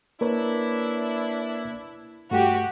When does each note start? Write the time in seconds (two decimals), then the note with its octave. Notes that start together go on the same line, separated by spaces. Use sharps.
0.21 A#3 D4 E4 A#4 B4 C#5
2.31 G2 A3 F#4 G4